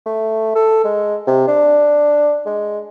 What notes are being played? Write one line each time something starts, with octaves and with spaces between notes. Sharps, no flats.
A3
A4
G#3
C3
D4
G#3